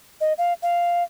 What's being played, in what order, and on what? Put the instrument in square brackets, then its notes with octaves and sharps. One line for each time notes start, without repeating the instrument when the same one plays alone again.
[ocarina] D#5
F5
F5